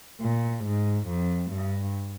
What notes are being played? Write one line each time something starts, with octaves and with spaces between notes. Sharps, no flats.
A#2
G#2
F2
G2